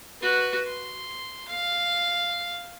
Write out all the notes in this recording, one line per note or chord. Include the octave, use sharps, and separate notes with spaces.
F#4 B4
C6
F5